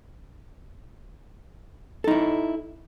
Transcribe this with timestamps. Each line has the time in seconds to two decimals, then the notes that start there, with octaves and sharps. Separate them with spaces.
2.04 A4
2.08 D#4
2.11 E4